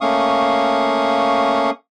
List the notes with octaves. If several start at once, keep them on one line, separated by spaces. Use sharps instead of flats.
A3 A#3 C#4 F5 C#6 D#6